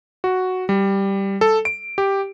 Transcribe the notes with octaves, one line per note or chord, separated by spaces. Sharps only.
F#4
G3
A4
D7
G4